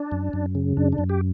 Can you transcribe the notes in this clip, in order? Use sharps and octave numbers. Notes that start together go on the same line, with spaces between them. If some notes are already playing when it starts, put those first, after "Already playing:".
Already playing: D4
F#2
F#2
C#3
F#2 D4
D4
F#2
G4